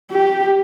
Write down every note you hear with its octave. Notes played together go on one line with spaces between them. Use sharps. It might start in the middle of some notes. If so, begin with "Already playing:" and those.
G4